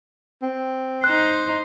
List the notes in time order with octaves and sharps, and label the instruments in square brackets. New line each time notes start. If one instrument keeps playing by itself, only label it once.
[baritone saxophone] C4
[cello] D#4 C5 [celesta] F#6